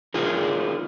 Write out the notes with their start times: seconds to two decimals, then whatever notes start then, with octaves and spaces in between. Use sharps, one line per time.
0.14 D#4 F4 G#4 A#4